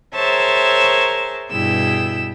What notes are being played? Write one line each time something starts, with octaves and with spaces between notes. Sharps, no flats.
G#4 A#4 C5 C#5 E5 A5
G2 B2 E4 G#4 G5 E6